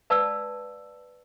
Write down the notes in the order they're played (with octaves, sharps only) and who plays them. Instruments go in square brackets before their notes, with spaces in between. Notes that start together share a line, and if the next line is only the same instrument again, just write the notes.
[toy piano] B4 D5 F5 A5 E6